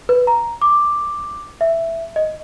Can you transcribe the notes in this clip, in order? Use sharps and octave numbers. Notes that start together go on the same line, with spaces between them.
B4
A#5
D6
E5
D#5